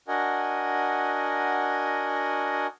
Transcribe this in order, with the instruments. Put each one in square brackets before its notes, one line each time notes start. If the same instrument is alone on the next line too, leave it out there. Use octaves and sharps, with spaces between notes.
[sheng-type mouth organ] D4 F#4 A#4 D#5 F#5 G#5